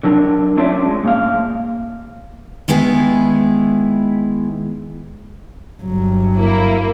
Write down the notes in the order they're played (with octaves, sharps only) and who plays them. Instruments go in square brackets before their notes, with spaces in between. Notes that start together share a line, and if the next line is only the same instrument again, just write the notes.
[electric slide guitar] D3 F#3 D4 A#4
C#4 D4 F4 C#5 D5 E5
G#3
G#2 A#3 F5
[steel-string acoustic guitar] D#3 G#3 B3 E4 G#4
[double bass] G1 F#3
[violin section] A#3 E4